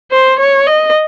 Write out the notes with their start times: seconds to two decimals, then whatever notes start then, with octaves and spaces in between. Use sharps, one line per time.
0.11 C5
0.39 C#5
0.67 D#5